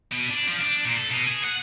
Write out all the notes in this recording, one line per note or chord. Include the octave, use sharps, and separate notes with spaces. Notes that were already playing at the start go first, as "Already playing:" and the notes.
B2
D4
F3
D4
A#2
A4
B2
G#4
F#5